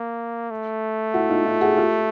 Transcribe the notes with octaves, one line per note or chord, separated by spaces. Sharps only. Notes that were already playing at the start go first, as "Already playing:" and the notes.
Already playing: A#3
A3
E4 F#4
D#4 F4
D#4 F4
F#4 G#4
F4 G4